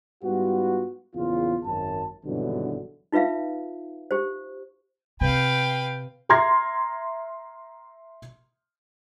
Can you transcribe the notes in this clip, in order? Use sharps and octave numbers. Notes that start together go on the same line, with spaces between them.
G#2 G3 B3 F4 F#4
E2 A#2 C#3 F4
G#1 F#2 A5
G#1 G2 B2 D3 E3 F#3
D#4 F4 B4 E5 F5
G4 C5
C3 B4 F5 G5
E5 A#5 C6 F6 G#6 A#6